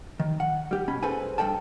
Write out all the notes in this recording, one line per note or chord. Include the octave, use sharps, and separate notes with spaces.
D#3
F#5
G3 G4
B2 C#4 B5
G#4 A4 B4 C5 G#5
G2 G#3 A4 D5 G5 A5